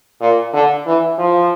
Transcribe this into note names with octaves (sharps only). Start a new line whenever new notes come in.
A#2
D3
E3
F3